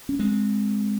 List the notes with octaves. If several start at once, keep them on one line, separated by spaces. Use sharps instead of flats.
C#4
G#3 C4